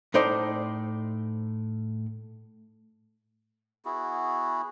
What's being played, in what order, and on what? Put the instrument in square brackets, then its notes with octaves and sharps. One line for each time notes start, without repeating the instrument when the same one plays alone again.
[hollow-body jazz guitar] A2 D#4 C5 D5
[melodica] B3 E4 F#4 G#4